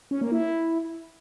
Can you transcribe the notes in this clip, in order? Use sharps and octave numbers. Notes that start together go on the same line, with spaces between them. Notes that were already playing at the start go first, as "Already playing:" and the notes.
C#4
A#3
E4